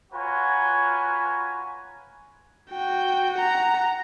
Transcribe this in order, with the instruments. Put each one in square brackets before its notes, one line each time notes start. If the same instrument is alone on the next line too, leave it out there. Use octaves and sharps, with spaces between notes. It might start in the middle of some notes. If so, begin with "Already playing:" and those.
[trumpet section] F4 F#4 B4 C#5 G#5 A#5
[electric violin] F#4 G5
F#5 A#5